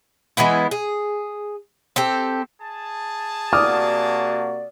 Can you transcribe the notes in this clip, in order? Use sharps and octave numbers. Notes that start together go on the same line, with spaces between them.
E3 G#3 B3 E4
G#4
C4 G4 A4
G#4 A5
C3 A#3 F#4 D5 D6 D#6 F6